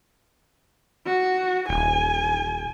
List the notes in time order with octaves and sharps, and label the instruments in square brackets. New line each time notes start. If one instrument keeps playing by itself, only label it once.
[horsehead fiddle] F#4
[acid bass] D#1 [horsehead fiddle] G#5